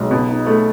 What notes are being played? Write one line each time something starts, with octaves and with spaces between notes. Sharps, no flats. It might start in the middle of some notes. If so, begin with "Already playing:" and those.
Already playing: B1 G#3
B2
D#4
A3